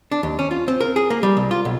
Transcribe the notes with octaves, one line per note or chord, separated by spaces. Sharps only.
D4
D#2
C#4
F4
C4
A#4
G#4
A#3
G3
C2
F4
B1